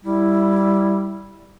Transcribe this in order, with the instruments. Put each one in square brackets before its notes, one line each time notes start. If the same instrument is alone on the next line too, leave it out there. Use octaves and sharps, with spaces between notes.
[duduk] G3 [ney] E4